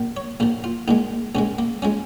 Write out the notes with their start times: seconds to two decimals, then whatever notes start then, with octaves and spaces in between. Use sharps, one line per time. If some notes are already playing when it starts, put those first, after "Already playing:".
Already playing: A#1 A#2 F3
0.17 C#5
0.40 A#1 A#2 F3 A#4
0.64 F4
0.88 A#1 A#2 G#3 D#4
1.35 A#1 A#2 G#3 C#4
1.59 A#3
1.82 F3 G#3 C#4